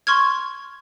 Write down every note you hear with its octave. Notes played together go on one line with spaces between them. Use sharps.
C6 C#6 F6 G#6